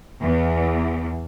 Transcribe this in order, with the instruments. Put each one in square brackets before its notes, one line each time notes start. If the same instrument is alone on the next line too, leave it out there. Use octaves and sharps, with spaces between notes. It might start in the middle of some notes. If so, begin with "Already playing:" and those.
[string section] E2